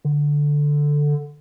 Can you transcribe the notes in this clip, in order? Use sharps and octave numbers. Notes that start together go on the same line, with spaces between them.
D3